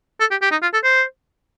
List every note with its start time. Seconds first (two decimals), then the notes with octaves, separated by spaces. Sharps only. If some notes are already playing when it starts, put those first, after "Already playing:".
0.20 A4
0.31 G4
0.42 G4
0.51 D#4
0.62 F4
0.74 A4
0.84 C5